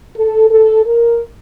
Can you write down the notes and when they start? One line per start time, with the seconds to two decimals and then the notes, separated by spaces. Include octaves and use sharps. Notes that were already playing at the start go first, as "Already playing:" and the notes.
0.16 A4
0.50 A4
0.85 A#4